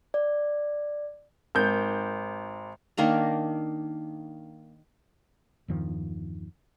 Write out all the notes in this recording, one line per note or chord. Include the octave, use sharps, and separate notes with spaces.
D5
G#1 G6
D#3 A#3 D4 A#5
E2 G2 D#3 F3